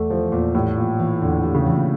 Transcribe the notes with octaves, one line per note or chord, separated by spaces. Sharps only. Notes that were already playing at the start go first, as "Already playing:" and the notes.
Already playing: E2 A3
E3 F3
E2 A#2
A2 G3
A#2 E3
A#2 E3
E2 D3
D3
G3
C#3
E3
A#2